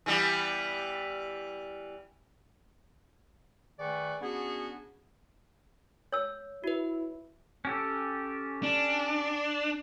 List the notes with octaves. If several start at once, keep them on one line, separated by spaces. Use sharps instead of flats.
E3 G3 B3
D#3 A3 G#4 B4 D5 C#6
B3 C#4 D4 F#4 G#4
C#5 E6
E4 F#4 B4
C#4 G4 A4
D4